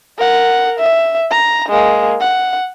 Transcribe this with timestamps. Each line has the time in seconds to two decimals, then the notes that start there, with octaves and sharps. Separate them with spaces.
0.18 A#4 F#5
0.80 E5
1.31 A#5
1.69 G#3 A#3
2.20 F#5